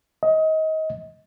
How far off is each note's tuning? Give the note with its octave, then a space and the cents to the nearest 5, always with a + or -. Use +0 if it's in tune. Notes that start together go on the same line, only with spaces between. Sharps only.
D#5 +25